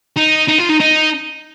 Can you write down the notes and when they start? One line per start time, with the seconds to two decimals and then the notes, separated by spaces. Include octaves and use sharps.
0.17 D#4
0.48 D#4
0.59 F4
0.70 D#4
0.80 D#4